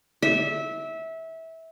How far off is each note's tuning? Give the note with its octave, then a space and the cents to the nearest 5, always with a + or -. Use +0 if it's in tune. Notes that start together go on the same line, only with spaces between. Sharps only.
E5 -20